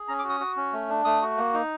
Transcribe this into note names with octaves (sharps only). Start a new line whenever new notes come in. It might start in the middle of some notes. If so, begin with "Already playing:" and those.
Already playing: G#4
C#4 A#5
D6
F#4
D#6
F#4
C#4
A3
D4
A3 D#6
F#4
A#3
D#4